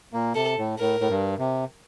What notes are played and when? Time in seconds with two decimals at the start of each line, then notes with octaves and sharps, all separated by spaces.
0.13 A#2 A#3
0.35 C3 A4
0.58 A2
0.79 A2 A#4
1.00 A2
1.09 G2
1.38 C3